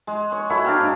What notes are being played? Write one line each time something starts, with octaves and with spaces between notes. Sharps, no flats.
G#3
C#5
E4 F#4 A4 C#5
D4 F5 G5 A#5
G#2